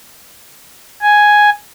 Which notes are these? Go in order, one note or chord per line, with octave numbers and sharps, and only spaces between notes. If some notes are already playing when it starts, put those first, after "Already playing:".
G#5